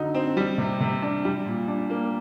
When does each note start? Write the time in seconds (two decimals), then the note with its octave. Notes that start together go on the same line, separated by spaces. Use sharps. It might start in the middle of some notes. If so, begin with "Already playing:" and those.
Already playing: D3 F#3 D#4
0.14 C4
0.37 G3
0.58 C3
0.81 C3
1.02 D4
1.25 G3
1.46 A#2
1.68 D4
1.90 A#3